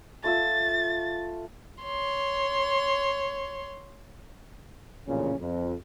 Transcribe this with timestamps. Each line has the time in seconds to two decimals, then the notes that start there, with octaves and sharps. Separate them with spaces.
0.24 A3 F4 E6 A6
1.83 C#5 C6
5.08 A1 F2 A#2 C#3 C#4
5.39 F2